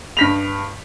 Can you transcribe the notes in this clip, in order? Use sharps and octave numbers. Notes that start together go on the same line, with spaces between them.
G2 B6 F7